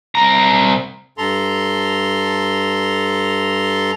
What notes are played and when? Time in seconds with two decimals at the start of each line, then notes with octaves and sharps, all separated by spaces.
0.15 C2 A#5
1.18 G2 A4 A#5 C6